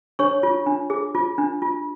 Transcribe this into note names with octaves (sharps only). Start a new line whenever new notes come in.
D4 C#5 C#6
F4
D4
G#4
F4
D4
F4